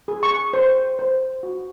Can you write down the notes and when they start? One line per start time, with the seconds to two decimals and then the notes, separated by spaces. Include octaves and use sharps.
0.08 G#4
0.23 C#6
0.53 C5
0.99 C5
1.43 F#4